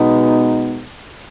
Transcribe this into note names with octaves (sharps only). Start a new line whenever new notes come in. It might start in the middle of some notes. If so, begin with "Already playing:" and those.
Already playing: B2 G#3 B3 D#4